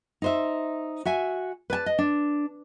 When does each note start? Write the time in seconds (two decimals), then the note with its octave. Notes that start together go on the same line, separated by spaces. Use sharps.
0.22 D#4 C5 E5
1.05 F#4 E5 G#5
1.70 B4 D5 G#5 A5
1.86 D#5
1.99 D4